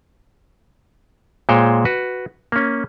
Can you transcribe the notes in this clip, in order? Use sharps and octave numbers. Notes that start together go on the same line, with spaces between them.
A#2 G#3 C5 C#5 G5
F#4 B4
A#3 C#4